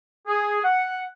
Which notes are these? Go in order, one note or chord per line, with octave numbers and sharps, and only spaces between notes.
G#4
F#5